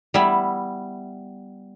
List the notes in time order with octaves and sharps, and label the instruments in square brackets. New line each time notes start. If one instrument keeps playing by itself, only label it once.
[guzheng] G3 B3 E4 E5